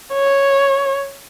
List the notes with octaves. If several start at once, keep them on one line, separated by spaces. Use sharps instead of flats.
C#5